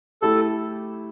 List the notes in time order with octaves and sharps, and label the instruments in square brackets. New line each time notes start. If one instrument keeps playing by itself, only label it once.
[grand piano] A3 E4 G4 [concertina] A4